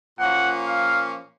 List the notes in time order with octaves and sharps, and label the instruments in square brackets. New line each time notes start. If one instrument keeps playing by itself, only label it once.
[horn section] A#2 F3 A#3 C#4 [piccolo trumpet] F#5
[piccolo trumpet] F5